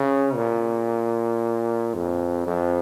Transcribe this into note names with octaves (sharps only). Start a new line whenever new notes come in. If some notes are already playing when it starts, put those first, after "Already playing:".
Already playing: C#3
A#2
F2
F2